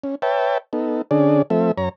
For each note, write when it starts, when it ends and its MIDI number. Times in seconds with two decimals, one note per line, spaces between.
0.04 0.15 61
0.22 0.58 71
0.22 0.58 73
0.22 0.58 76
0.22 0.58 79
0.22 0.58 81
0.73 1.02 59
0.73 1.02 63
0.73 1.02 69
1.11 1.42 50
1.11 1.42 61
1.11 1.42 62
1.11 1.42 68
1.11 1.42 74
1.50 1.72 53
1.50 1.72 57
1.50 1.72 60
1.50 1.72 69
1.50 1.72 76
1.78 1.89 42
1.78 1.89 73
1.78 1.89 82